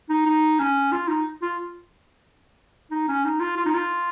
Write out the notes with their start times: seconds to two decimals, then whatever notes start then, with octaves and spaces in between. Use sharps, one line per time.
0.09 D#4
0.26 D#4
0.59 C#4
0.92 F4
1.08 D#4
1.42 F4
2.91 D#4
3.08 C#4
3.24 D#4
3.40 F4
3.57 F4
3.66 D#4
3.74 F4